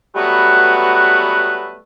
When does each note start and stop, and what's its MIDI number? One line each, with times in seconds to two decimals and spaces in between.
0.15 1.77 54
0.15 1.77 55
0.15 1.77 57
0.15 1.77 59
0.15 1.77 66
0.15 1.77 71